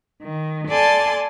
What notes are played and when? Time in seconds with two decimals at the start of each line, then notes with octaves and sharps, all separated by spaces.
0.22 D#3
0.69 A4 D5 G#5 A5 C6 A6